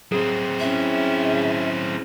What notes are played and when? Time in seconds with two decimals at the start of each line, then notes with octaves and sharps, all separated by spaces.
0.12 F#3 C4 G#4
0.60 C#4 E4 E5